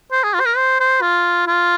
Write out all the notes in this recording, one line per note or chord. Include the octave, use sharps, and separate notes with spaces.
C5
G#4
F4
C5
A#4
C5
C5
F4
F4